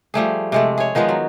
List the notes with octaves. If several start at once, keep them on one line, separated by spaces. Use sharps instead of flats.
F3 G3 A3 G#4
C3 G#3 A3
G#4 C#5
D#3 F3 G#3 B3
F#3